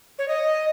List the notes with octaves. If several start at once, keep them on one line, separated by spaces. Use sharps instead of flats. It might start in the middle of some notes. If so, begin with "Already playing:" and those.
C#5
D#5